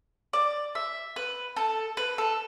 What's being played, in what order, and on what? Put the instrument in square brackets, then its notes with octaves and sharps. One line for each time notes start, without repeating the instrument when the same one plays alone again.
[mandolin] D5
E5
B4
A4
B4
A4